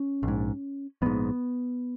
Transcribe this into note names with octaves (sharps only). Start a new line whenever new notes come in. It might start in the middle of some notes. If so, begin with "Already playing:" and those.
Already playing: C#4
A#1
G#2
A#1 G#2 B3